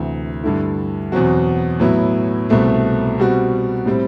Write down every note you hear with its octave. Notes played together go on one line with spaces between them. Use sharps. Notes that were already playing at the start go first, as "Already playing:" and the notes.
Already playing: D2 C3 E3
G2 D3 A3 E4
E2 B2 F#3 C4 F#4
A2 F#3 B3 E4
C2 B2 A3 C4
B2 G3 C4 F#4
A2 G3 C4